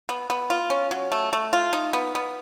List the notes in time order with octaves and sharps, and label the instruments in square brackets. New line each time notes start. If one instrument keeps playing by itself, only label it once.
[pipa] B3
B3
F4
C#4
F#3
A3
A3
F4
D#4
B3
B3